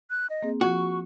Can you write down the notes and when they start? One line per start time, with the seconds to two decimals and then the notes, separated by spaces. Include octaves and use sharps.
0.10 F#6
0.30 D#5
0.43 A#3 C4 G#4
0.61 F3 F4 F#4 C#6